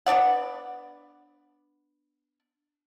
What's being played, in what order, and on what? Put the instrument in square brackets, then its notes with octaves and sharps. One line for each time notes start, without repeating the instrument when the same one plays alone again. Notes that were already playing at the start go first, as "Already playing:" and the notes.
[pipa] B3 D4 D5 F#5